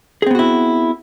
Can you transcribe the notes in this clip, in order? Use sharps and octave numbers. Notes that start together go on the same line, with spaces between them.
B3 C4 E4 F#4 G#4